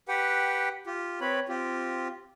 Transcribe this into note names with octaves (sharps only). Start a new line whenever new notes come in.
G4 B4 F#5 G5
F4 G4
C4 B4 C#5 B5
C4 F4 G4